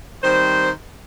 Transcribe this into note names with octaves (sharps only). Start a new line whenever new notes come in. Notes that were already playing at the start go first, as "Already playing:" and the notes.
D#3 G3 C4 C5